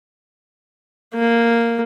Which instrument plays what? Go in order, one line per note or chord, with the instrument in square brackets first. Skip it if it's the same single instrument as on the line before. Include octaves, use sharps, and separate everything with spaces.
[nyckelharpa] A#3